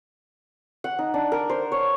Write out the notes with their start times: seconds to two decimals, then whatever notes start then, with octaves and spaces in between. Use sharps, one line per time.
0.84 F#5
0.99 D#4
1.14 D4
1.32 A#4
1.50 C5
1.72 C#5